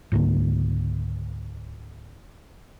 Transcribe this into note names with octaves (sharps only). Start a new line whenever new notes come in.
C#2 G#2 D3 A#3